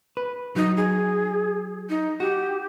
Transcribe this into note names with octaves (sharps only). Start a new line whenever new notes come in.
B4
F#3 D#4
G#4
D#4
F#4 G4